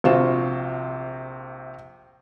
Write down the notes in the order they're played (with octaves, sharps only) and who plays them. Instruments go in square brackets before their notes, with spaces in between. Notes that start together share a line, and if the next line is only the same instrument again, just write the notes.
[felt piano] A#1 C3 F4 F#4 C5 E7